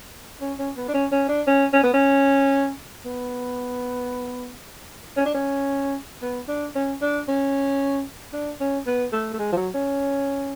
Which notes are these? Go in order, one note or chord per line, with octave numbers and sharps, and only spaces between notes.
C#4
C#4
B3
D4
C#4
C#4
D4
C#4
C#4
B3
C#4
B3
C#4
D4
C#4
B3
D4
C#4
D4
C#4
D4
C#4
B3
A3
A3
G#3
F3
F#3
C#4